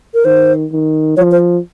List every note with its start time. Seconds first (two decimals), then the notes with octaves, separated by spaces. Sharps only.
0.14 A#4
0.25 D#3 C5
0.71 D#3
1.17 F3 C#5
1.31 C5